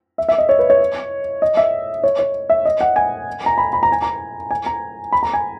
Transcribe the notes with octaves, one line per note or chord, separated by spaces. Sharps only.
E5
E5
D#5
C#5
B4
C#5
D#5
E5
C#5
C#5
E5
D#5
F#5
G#5
A#5
B5
B5
A#5
G#5
A#5
G#5
A#5
B5
A#5
G#5